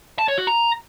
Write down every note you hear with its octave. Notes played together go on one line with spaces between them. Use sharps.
A5
C#5
F#4
A#5